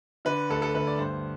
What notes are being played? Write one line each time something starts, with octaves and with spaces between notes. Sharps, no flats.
D3 B4
D2 A4
A4
D2 B4
D5
G2 C5